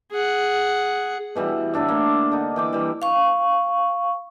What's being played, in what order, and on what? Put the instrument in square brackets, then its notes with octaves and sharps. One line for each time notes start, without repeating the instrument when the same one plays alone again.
[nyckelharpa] G#4 F#5
[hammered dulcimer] B2 E3 G3
A2 D3 D4 E5
A#3
D3 D#4
E3 G5 D6
E3 G3
[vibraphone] F5 C#6